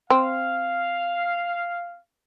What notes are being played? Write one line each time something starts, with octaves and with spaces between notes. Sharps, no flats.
C4 F5